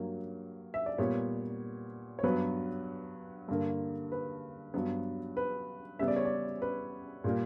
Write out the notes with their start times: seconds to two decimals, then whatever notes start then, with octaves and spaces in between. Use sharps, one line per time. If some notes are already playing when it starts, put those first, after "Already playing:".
Already playing: G2 F#3 A#3
0.74 E5
0.86 D5
0.98 A#2 G3 B3 C#5
2.19 C#5
2.23 G2 F#3 B3 B4
3.48 G2 D3 A#3
4.12 B4
4.74 G2 F#3 B3
5.37 B4
5.99 C#3 G3 B3 E5
6.08 D5
6.16 C#5
6.25 D5
6.62 B4
7.24 A#2 G3 A#3